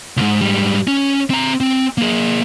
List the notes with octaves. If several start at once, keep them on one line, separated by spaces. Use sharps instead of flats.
C#2 G#2
G#2 G3
C#4
C4 A#5
C4
A#3 G#4